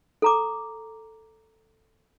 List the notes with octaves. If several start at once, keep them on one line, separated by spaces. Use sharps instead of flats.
A4 A#5 D6